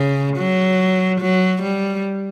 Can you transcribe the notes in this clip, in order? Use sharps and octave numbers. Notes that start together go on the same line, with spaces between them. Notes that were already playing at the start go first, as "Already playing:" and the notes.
Already playing: C#3
F#3
F#3
G3